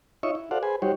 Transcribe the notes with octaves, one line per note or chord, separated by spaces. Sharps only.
D#4 F4 C#5 D#5 E5 C#6
E4
F#4 A4 C5 D5 F5 F#5
G#4 B4 C5 G#5
G3 D#4 F#4 G4 C5 C#5